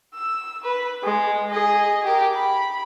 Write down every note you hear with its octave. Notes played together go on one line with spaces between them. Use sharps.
E6
B4
G#3
G#4 D#5
G4 A#4
B5